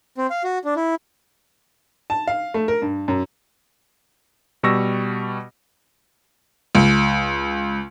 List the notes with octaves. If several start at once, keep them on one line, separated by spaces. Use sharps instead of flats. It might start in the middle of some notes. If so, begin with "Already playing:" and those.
C4
F5
F#4
D4
E4
A5
F5
A3
A#4
G2
F#2
B2 G3 C#6 E6 A#6
C#2